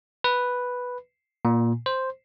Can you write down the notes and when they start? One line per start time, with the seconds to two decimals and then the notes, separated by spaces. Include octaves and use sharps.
0.24 B4
1.45 A#2
1.86 C5